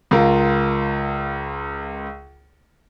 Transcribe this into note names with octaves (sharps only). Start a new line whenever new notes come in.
C#2 F4 A#4